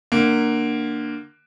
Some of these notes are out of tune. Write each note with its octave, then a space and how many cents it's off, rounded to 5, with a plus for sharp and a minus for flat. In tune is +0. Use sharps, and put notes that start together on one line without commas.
D3 +20 A#3 +0